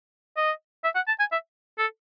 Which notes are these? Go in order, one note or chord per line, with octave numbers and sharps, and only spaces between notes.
D#5
E5
F#5
A5
G#5
E5
A4